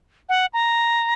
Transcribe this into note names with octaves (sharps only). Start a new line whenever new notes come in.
F#5
A#5